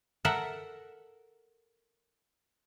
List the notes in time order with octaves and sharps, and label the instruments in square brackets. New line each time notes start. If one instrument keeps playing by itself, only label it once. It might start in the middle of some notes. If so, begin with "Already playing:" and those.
[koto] A4 A#4 E5 F#5